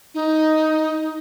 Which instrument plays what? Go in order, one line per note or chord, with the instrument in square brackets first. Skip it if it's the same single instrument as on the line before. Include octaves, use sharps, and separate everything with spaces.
[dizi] D#4